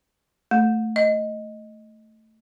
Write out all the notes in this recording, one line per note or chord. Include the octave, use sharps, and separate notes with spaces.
A3
D#5